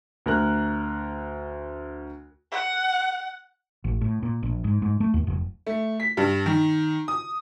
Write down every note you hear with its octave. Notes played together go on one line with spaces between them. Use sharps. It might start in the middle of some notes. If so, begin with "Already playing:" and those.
D2 A#4 F#6
F#5
A1
A2
A#2
A#1
G#2
G#2
A3
D#2
F1
A3
B6
G2
D#3
D#6